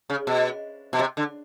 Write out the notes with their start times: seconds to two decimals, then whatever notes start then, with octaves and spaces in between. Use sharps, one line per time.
0.10 C#3
0.27 B2
0.93 B2
0.99 C3
1.17 D3